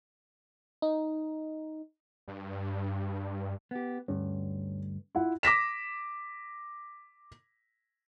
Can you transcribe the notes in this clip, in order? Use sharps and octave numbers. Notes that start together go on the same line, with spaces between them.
D#4
G2
B3 G4
D2 G2 C#4
E4 F4 F#5
D6 A#6 B6 E7